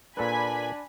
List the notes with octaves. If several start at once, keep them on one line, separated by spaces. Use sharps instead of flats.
A#2 D4 A4 B4 G#5 B5